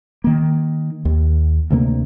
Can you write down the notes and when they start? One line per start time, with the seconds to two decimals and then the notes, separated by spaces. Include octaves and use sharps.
0.24 D#3 A#3
1.05 D#2
1.71 D2 C3 G#3 A#3